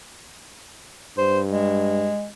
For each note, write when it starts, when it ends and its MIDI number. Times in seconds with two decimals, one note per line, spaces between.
1.18 2.10 43
1.18 1.40 72
1.51 2.29 56